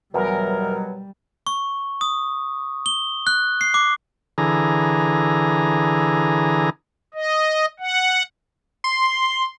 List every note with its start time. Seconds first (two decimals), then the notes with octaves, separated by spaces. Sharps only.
0.14 E2 B2 F#3 G3 A#4
1.47 C#6
2.01 D#6
2.86 G7
3.27 F#6
3.61 C7
3.74 D6
4.38 D3 E3 G#4 A#5
7.14 D#5
7.80 F#5
8.84 C6